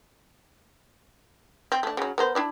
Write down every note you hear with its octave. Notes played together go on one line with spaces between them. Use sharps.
C4
A3 D4
C#3 F#3
B3 A#4 C5
D4 E4 D5